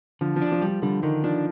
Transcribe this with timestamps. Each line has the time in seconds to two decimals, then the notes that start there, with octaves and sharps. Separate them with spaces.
0.21 D3 F3
0.36 F3
0.42 D4
0.52 F3
0.62 G3
0.67 F3
0.82 D3 G3
1.03 D3 D#3
1.24 F3 D4